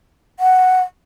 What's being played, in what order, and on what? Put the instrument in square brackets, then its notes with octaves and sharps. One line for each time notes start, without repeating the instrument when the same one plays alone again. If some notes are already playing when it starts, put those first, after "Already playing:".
[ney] F#5